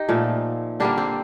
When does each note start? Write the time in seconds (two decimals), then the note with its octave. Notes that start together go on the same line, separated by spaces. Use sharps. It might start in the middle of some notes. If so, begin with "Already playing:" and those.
Already playing: D#4 G4
0.08 A#2 F3 A3
0.80 D3 G3 A#3 D4
0.98 C4